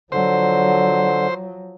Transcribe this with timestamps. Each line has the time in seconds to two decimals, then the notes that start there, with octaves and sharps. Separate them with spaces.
0.12 D3 F3 F#3 C5